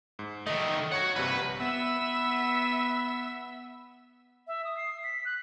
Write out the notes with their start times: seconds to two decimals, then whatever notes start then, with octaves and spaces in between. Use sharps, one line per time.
0.19 G#2
0.47 D#3 A3 D#5
0.92 F#4 C#5 F#5 C#6 G#6
1.16 A#1 G2 C3 B4
1.60 B3 E5 E6
4.47 E5
4.65 D#6
4.77 C7
5.04 B6
5.25 F#6